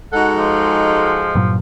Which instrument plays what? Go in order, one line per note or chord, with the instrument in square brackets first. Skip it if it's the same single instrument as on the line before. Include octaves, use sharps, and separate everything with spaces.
[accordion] G#3 [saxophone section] D#4 F#4 A4 [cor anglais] F#5
[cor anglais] F3
[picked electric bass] G2 A#2 F#3